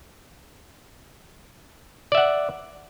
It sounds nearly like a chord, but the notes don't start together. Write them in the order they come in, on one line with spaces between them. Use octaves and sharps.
D5 E5 F#5